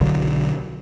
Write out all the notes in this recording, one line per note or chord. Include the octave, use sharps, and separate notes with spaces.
B1 D3 F#3